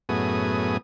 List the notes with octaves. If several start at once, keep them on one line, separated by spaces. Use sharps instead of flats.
F#2 A2 B3 G#4 D#6